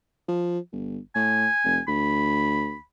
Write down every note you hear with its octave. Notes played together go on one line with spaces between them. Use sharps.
F3
G1
A2 G#5
F1
D2 B5